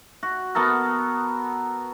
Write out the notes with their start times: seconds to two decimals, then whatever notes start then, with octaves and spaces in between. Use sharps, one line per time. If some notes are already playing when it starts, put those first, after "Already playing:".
0.23 F#4
0.55 B3 F#4 A4 A#4